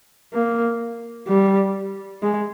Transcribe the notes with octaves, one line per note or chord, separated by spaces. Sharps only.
A#3
G3
G#3